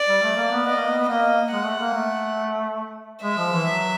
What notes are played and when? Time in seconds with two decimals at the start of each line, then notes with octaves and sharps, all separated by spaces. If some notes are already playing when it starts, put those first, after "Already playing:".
Already playing: D5
0.08 G3
0.23 A3
0.36 A#3
0.51 B3
0.66 B3 D#5
0.76 A#3
0.87 B3
0.97 B3
1.08 A#3 D#5
1.52 G#3 F#5
1.65 A3
1.80 A#3
1.94 A3
3.23 G#3 E5
3.38 F3
3.53 E3
3.67 F#3